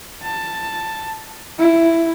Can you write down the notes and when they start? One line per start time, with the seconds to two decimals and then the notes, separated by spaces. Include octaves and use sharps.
0.23 A5
1.59 E4